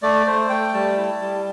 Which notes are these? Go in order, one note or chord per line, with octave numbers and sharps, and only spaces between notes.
A3 D5
A3 C5
A3 G5
G3 A5
E4
G3